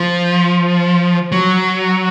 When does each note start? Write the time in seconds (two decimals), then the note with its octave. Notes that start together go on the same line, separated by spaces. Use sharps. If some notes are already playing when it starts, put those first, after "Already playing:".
Already playing: F3
1.32 F#3